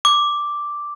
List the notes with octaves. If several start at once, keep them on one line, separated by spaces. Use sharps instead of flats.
D6